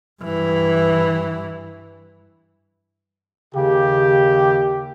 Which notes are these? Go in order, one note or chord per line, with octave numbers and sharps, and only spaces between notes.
G2 E3
D#2 C#3 G4